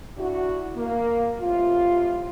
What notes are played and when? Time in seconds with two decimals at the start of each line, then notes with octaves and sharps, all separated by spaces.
0.17 D4 E4 F#4
0.76 A#3
1.40 A2 C3 F4